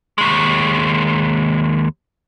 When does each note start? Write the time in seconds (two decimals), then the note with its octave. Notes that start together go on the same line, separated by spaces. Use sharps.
0.18 D#2 G#3